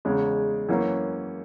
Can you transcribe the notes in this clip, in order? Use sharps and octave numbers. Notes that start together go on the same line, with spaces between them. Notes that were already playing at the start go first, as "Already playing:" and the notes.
E2 C#3 G#3
F#2 E3 A#3 C#4